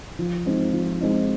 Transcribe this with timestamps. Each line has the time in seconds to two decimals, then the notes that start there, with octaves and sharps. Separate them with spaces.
0.19 F3
0.46 G#3 C4 D#4
0.73 F3
1.01 G#3 C4 D#4